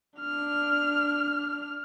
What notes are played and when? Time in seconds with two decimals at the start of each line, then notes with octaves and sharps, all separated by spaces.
0.20 D4 F6